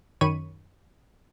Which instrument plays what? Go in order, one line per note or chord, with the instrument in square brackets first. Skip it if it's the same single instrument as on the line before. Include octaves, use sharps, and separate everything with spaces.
[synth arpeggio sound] F#2 D#3 C#5 B5 C#6 D#7